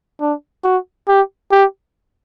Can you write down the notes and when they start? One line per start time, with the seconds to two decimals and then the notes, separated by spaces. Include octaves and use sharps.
0.20 D4
0.64 F#4
1.08 G4
1.51 G4